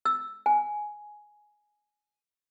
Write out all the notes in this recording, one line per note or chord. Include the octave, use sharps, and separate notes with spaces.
E6
G#5